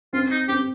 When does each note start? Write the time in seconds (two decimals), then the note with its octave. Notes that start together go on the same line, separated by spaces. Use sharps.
0.13 C4 F4
0.31 D#4
0.48 C4 G4